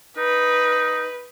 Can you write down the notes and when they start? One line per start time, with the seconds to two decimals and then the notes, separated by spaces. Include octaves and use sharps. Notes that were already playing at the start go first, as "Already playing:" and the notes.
0.17 D#4 B4